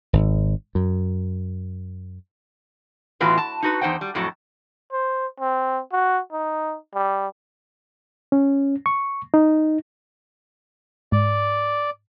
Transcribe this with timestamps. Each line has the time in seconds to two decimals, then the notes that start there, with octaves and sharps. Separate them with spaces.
0.13 G#1
0.75 F#2
3.20 A2 E3 B3 F4 F#4 B4
3.37 A5
3.63 D#4 F#4 B4
3.81 E2 D#4 C5 F#5 G5
4.01 G3
4.15 F2 A2 F#3 F#4 A4
4.92 C5
5.40 C4
5.92 F#4
6.33 D#4
6.95 G3
8.32 C#4
8.86 C#6
9.34 D#4
11.12 G#2 D5